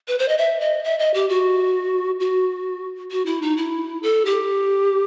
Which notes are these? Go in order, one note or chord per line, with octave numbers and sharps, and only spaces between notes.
B4
C5
D#5
E5
D#5
E5
D#5
G4
F#4
F#4
F#4
E4
D#4
E4
A4
G4